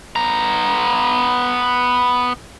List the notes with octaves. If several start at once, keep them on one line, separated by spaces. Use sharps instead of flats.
B3 A#5